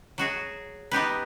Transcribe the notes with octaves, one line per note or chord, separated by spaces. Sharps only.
F#3 F#4 G#4
B3 D#4 G4 B4